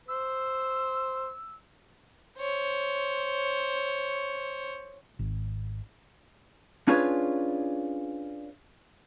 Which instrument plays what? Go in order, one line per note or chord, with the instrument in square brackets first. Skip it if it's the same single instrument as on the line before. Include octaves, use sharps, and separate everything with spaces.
[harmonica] C5 [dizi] E6
[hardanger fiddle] C5 C#5
[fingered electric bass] G#1
[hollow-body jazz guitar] C#4 D4 F4 G#4 B4 C#5